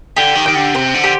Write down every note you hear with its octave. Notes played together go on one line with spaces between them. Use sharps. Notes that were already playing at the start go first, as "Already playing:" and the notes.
D3 G4
D#3
D#3 G5
D3
C3 C5
D3
G4